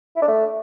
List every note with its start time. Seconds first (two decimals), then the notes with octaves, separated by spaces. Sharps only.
0.16 E4
0.22 D4
0.28 A3